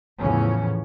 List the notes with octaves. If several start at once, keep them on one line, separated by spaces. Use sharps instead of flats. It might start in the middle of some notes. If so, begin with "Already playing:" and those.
E2 A2 C#3 F3 C#4